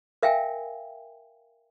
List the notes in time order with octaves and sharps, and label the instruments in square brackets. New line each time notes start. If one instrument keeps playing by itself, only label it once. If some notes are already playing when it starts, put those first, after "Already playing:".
[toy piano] A#4 E5 F5 G5 G#5